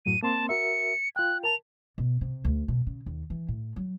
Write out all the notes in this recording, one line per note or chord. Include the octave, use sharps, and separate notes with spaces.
F#2 A2 F#3 D#7
A#3 C4 A5 C6
F#4 A#4 E5 C#7
F4 G5 F#6
A#4 A5 F7
B2
C3
D2
B2
C#3
D#2
E3
A2
F#3